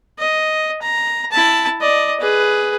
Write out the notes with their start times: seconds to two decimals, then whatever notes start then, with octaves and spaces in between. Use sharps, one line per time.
0.18 D#5
0.82 A#5
1.32 E4 A5
1.81 D5 D#5
2.20 G#4 B4